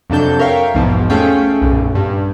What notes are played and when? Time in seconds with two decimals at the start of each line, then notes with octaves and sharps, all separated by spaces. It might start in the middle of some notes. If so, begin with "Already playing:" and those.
0.10 F2 C3 F#3 D4 A4 G6
0.39 A#4 C#5 E5 F5 G5
0.74 B1 E2 G#2 B2 F3
1.10 A3 C#4 F4 G#4 G5
1.62 B1 F#2 A#2
1.95 G2